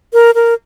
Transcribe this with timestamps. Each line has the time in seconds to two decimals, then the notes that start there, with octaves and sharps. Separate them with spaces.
0.13 A#4
0.35 A#4